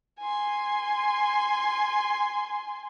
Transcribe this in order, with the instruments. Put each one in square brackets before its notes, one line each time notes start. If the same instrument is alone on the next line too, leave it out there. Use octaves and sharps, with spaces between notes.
[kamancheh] G#5 C6